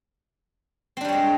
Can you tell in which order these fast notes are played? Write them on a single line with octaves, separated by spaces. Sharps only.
C4 D4 G3 C#5 G#3